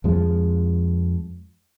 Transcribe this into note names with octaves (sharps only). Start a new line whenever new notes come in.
F2 F3 G#3